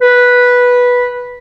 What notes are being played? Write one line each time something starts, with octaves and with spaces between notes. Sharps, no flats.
B4